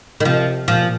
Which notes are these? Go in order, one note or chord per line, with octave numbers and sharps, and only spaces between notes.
D#3
C3 F3
A#2 F3